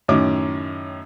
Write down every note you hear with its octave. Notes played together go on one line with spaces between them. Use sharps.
F#2 A2 D#3 C#4 D6